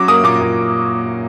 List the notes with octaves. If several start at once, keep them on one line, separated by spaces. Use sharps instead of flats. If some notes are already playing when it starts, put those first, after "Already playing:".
Already playing: F#3 C#4 D6
A#3 D#6
A#2 D6
A#2